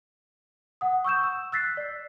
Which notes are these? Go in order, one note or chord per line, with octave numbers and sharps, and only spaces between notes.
F#5 D#6
C#6 E6 G6 E7
E6
E6 F#6 A6 B6 C7
D5